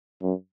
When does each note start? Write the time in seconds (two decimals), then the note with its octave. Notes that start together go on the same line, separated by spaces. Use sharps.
0.22 F#2